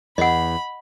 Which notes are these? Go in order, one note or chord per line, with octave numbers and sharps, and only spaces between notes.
E2 D#5 F#5 B5